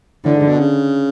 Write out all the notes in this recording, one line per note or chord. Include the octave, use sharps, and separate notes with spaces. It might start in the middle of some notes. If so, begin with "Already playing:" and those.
A2 D3
G#2
B2
C#3